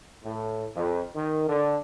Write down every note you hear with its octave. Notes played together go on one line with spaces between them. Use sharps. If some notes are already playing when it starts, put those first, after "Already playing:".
A2
F2
D#3
D3